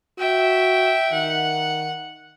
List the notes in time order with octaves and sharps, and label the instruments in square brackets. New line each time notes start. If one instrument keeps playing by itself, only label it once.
[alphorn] F#4 [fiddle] E5 G5
[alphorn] D#3 [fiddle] F#5